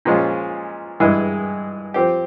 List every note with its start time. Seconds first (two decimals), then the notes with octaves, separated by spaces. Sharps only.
0.05 A#2 F3 G#3 C#4 F4
1.00 G2 E3 G#3 E4 G#4
1.94 F3 C4 G4